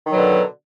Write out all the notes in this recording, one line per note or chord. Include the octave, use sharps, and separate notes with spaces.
B2 D3 D#3 F#3